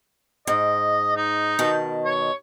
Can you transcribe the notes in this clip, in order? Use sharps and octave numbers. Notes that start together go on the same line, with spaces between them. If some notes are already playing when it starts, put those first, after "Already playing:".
G#2 D#5
D#4
B2 D#3 A5
C#5